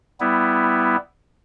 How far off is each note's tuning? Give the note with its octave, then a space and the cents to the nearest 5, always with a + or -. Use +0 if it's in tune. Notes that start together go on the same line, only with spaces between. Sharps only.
G3 +0 B3 +10 E4 +0